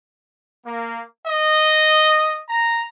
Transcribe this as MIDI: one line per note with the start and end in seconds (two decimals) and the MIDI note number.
0.64 1.02 58
1.26 2.40 75
2.48 2.83 82